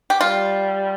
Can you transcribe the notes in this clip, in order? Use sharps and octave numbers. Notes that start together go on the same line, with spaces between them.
G4
G3 F4